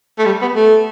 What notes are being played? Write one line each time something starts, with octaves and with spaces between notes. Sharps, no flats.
A3
G3
B3
A3